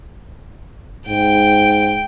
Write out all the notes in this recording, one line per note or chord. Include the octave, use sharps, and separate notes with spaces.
G#2 G5